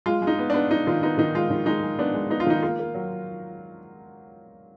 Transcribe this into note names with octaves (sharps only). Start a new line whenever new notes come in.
G#3 F4
G#3
D#4
B3
B3 D4
B3 D#4
D#3 F4
B3 D#4
D#3 D#4
G#3 F4
D#3
G#3 D#4
G#3
B3 D4
G#3
B3 D#4
F4
D#3 D#4
A#3 F4
A#3
F#3